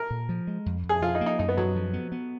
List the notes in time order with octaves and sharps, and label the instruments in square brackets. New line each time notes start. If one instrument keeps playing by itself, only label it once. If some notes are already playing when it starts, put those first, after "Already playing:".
Already playing: [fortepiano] A#4
[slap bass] A#2
F3
G#3
F2
F2
[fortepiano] G#4
[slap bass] F3 [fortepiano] F4
[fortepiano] D#4
[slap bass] A#3
[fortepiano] D#4
[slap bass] F#2 [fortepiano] D#4
[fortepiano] B3
[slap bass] F#2 [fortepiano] F#3
[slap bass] F3
B3
B3